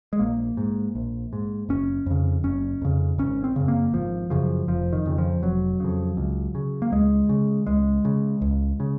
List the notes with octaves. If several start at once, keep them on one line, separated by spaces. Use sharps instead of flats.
G#3
A#1 A#3
G#2
A#1
G#2
F#1 C#4
F2 C#3
F#1 C#4
F2 C#3
G#1 C#4
C4
F#2 C#3
A#3
G#1 F3
F#2 C#3 F3
F1 F3
D#3
F2 C#3
F3
F1 F#3
F2 C#3
C#2
C#3
A#3
C#2 G#3
C#3
C#2 G#3
C#3
C#2
C#3